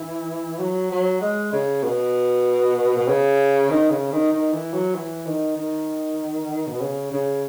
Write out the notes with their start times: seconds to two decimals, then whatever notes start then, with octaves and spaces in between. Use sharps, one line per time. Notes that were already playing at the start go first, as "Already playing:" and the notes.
Already playing: E3
0.59 F#3
0.91 F#3
1.21 G#3
1.53 C#3
1.83 B2
2.97 B2
3.08 C#3
3.70 D#3
3.90 C#3
4.12 D#3
4.32 D#3
4.53 E3
4.74 F#3
4.95 E3
5.26 D#3
5.57 D#3
6.67 B2
6.81 C#3
7.12 C#3